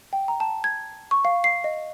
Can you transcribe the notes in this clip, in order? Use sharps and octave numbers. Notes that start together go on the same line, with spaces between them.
G5
A#5
A5
G#6
C#6
F5
C7
D#5